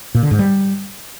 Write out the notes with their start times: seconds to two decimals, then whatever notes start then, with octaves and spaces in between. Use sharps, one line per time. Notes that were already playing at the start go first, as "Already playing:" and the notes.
0.15 A#2
0.23 D3
0.31 G#2
0.39 G3